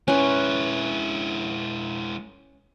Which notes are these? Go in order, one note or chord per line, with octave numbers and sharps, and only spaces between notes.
G#3 C#4 E4 B4